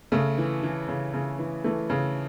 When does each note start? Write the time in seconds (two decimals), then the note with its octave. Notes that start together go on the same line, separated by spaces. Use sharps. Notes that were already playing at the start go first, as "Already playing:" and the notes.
0.12 C#3 A3
0.38 E3
0.63 E3
0.88 C#3
1.14 C#3
1.39 E3
1.64 E3 A3
1.90 C#3